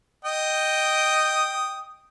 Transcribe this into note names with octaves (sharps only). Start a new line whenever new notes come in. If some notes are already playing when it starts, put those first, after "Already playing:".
D#5 G5 D#6